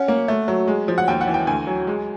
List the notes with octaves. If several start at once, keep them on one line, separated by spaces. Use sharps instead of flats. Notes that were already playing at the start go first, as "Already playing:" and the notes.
Already playing: C#4 F#5
A#3
A3
F#3
G#3
F3
F#5
D#2 G5
F#5
E3
G5
D2 G#5
F#3
G#3